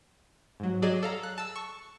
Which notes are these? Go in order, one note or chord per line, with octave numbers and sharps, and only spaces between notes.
G#2 F#3
F#3 G#4 D5 D#5 E7
A4 F5 A#5
F#6
A5 E6
C#6